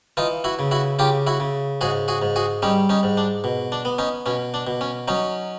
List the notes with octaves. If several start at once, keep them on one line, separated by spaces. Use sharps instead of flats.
E3 D#4 F4
E4 F#4
C#3
E4 F#4
C#3 F4 G4
E4 F#4
C#3
G#2 F#4 G#4
F#4 G#4
G#2
F#4 G#4
G3 C#4 D#4
C#4 D#4
G#2
D4
B2
D4
B3
C#4 D#4
B2 C#4
D4
B2
C#4
F#3 C#4 D#4